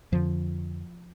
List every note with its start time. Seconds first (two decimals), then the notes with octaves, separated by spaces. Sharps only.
0.12 F2 D3 F3